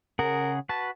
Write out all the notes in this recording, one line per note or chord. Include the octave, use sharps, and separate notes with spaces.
C#3 G#4 A#4 F#5
F#4 B4 A5